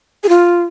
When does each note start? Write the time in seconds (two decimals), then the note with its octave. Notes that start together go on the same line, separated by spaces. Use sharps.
0.23 G#4
0.29 F4